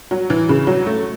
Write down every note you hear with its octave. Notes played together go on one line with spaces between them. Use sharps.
F#3
E3
C#3
F#3
A3